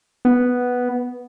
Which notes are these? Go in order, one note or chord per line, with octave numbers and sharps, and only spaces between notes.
B3